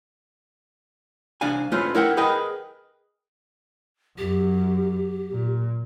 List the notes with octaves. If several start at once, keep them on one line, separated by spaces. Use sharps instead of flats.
C2 D4 F5 G#5
A3 C#4 F4 B4 C5
E4 A#4 F#5 G5
G#4 A#4 B4 D#5 G5
F#2 G4
A#2